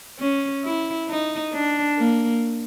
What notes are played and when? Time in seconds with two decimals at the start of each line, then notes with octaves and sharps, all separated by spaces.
0.19 C#4
0.64 E4
1.09 D#4
1.54 D4
1.99 A#3